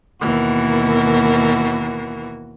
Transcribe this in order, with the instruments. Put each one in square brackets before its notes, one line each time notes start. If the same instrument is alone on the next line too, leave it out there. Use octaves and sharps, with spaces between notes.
[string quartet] D#2 B2 E3 F#4 A#4